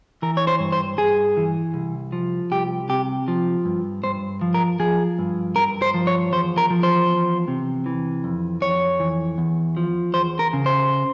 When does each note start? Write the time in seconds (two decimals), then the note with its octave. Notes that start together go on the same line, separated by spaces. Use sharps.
0.22 E3 A#4
0.37 C#5
0.47 C5
0.60 G2
0.72 C5
0.98 G2 G#4
1.37 E3
1.74 C2
2.12 F3
2.51 C2 G4
2.89 C3 G4
3.28 F3
3.65 G2
4.04 G2 C5
4.41 F3
4.54 A#4
4.80 F3 G#4
5.19 G2
5.56 G2 A#4
5.82 C5
5.94 F3
6.07 C#5
6.32 E2 C5
6.58 A#4
6.70 F3
6.83 C5
7.09 E2
7.48 C3
7.86 E3
8.24 F2
8.61 F2 C#5
9.00 E3
9.38 E2
9.77 F3
10.14 E2 C5
10.39 A#4
10.53 C#3
10.66 C5